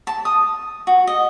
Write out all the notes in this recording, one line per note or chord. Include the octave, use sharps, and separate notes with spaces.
A5
D#6
F#4
D#5